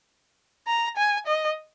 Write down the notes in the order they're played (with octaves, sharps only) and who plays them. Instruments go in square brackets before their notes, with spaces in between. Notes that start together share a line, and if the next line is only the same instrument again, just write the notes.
[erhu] A#5
G#5
D#5